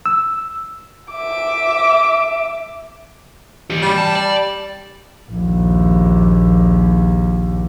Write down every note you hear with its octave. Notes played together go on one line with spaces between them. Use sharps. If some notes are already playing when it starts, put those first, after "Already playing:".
E6
E5 D6
E3 G4
G3
A5
D5
A#1 D#2